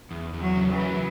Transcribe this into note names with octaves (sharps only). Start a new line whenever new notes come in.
E2
E2
F#3
C#3
E3
F#3